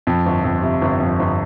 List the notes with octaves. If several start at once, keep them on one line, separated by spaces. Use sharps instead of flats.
F2
G1
F2
C3
G1
F2
G1